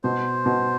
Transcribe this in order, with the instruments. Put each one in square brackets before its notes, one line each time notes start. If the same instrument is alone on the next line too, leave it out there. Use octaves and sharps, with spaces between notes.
[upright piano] B2 [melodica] C5
[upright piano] B2